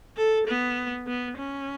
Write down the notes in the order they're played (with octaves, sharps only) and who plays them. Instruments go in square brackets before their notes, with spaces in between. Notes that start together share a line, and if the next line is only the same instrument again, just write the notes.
[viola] A4
B3
B3
C#4